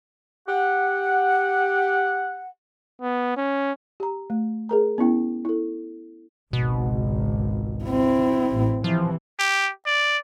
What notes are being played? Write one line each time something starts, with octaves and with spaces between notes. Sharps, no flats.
G4 F#5
B3
C#4
G4 A#5
A3
G#4 A#4 A#5
B3 C#4 E4 G5
E4 A4
G#1 C#2 B2
C4 E4
A1
C3 E3 F3
G4
D5